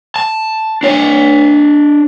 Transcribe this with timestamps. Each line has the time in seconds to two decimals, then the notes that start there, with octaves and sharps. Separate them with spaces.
0.16 A5
0.83 D4 C#5